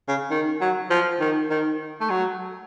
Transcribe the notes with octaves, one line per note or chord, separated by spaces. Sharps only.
C#3
D#3
F#3
F3
D#3
D#3
A3
F#3